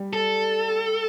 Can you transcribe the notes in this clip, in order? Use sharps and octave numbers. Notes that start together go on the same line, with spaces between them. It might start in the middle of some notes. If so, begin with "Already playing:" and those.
Already playing: G3 G4
A4